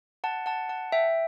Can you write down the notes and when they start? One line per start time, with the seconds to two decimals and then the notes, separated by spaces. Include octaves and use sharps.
0.24 F#5 A5
0.46 F#5 A5
0.69 F#5 A5
0.92 E5 G5